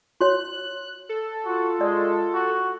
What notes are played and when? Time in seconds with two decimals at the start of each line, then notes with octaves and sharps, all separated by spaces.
0.21 F#4 C#5 F#6
1.09 A4
1.46 F4 F#4
1.81 G#3 D5
2.34 F#4